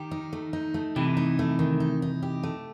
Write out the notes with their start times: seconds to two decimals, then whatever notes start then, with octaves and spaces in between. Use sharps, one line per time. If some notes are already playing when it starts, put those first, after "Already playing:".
Already playing: D#3 G4
0.11 D#4
0.33 A3
0.53 D#4
0.74 A3
0.96 C3 E3 G4
1.17 D#4
1.39 A3
1.59 D#3
1.80 D#4
2.02 D#4
2.22 G4
2.43 A3